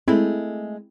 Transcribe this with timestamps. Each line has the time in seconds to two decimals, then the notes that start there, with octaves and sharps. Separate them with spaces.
0.08 G#3 A3 C4 E4